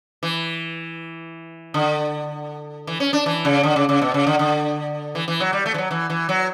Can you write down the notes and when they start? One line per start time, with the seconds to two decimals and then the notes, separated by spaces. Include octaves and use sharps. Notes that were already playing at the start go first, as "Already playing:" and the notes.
0.23 E3
1.74 D3
2.87 E3
3.00 C#4
3.13 D4
3.26 E3
3.45 C#3
3.63 D3
3.76 C#3
3.89 C#3
4.02 B2
4.14 C#3
4.27 D3
4.39 D3
5.15 E3
5.28 E3
5.40 F#3
5.53 G3
5.66 A3
5.74 E3
5.78 F#3
5.91 E3
6.10 E3
6.29 F#3